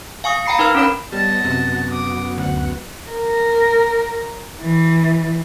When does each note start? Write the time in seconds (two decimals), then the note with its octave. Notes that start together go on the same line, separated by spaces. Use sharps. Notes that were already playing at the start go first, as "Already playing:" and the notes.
0.24 F5 G#5 C#6 D#6
0.46 F5 G5 A#5 B5 C7 C#7
0.59 D#4 A#4 B4 F5 F6
0.75 C#4 D4 A#4 C#5 B5
1.12 G3 B3 C#5 D#5 A5
1.45 F#2 C3 B3 F#4
1.90 D6 D#6
2.38 D2 F#5
3.11 A#4
4.62 E3